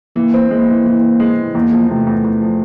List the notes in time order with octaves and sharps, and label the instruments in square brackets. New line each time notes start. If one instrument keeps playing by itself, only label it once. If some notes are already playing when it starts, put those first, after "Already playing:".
[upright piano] E3 [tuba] A#3
[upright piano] C4
[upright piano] G#3 [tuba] A#3
[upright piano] E3
E3
C4
G#3
E3
[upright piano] E2 [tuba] A#3
[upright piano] F3
[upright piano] C3 [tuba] A3
[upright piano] E2
E2
F3